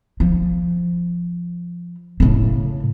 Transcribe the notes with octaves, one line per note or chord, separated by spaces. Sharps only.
F3
A2 C#3